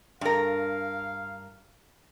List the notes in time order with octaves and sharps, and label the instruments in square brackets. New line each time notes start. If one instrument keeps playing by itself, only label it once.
[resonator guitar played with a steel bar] G2 A#4 [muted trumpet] F5